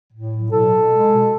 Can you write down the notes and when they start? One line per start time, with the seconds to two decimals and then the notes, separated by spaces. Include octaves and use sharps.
0.12 A2
0.32 F#3
0.51 B2 A4
0.72 B2
0.91 G#3
1.11 B2